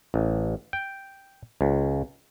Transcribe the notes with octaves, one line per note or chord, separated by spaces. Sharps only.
A1
G5
C#2